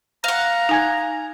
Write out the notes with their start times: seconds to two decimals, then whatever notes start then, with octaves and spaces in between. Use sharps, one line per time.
0.24 F5 F#5 A#5
0.69 D#4 G#5 G#6